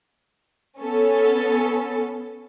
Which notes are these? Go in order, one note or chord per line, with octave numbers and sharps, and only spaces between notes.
B3 C#4 A4